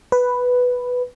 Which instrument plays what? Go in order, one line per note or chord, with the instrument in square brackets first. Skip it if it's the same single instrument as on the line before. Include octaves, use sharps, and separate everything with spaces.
[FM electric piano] B4